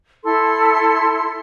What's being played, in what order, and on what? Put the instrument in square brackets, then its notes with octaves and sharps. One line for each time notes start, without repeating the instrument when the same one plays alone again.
[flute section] E4 A4 C6